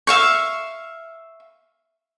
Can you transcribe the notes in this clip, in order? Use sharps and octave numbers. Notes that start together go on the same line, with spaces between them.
E5 F5 C#6